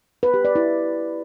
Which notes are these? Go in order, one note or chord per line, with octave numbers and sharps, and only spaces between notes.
B4
G4
D5
E4